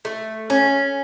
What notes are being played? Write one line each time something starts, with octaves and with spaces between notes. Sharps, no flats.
A3
C#4